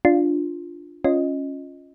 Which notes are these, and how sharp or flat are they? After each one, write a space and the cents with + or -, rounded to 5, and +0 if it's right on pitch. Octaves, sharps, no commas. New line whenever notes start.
D4 +0 F4 +0
C#4 +0 F4 +0 D#5 +0